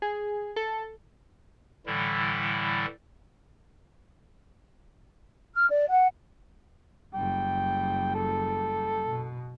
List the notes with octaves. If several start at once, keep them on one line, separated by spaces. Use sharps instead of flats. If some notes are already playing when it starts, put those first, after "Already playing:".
G#4
A4
A2 D3 E3 G3 E4
F6
D5
F#5
F#1 G3 G5
A4
B2